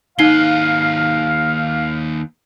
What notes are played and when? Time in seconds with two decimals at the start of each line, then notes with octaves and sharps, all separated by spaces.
0.19 D#2 D#4 B4 F5 C7 G7